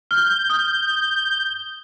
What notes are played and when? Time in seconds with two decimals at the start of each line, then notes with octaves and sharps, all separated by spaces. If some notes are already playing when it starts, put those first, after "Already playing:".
0.11 F6 G6
0.50 D#6